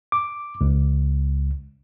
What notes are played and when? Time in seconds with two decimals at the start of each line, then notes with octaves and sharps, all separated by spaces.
0.12 D6
0.61 C#2